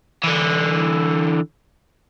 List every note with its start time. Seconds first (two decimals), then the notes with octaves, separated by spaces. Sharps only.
0.24 D3 E3